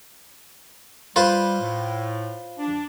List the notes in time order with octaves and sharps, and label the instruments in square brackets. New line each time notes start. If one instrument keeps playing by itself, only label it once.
[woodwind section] G3 [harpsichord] F4 B4 C5
[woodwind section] A2
D4